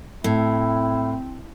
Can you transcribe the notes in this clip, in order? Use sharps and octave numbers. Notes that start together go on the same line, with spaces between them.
A2 C4 E4